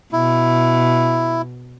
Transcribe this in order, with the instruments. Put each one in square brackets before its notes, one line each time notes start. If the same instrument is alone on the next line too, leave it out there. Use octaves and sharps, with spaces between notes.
[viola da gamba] B2 [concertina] E4